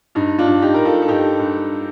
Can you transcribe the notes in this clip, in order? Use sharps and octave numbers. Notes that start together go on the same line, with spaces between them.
G2 D#4
D4 F4
G2
D#4 G4
G2 A#4
F4 A4
A4
G2 D#4 G4
G2